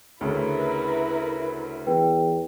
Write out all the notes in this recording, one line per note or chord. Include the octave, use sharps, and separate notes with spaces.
D2 C#3 E4 A#4 B4
E2 B4 G5